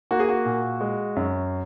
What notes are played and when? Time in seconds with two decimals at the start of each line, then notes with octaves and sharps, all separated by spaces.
0.11 A#3 F#4
0.20 G#4
0.29 F#4
0.45 A#2
0.81 G#3
1.16 F#2